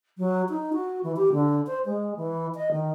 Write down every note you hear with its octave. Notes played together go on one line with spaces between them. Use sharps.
F#3
D#4
F#4
E3
G4
D3
C5
G#3
E3
D#5
D#3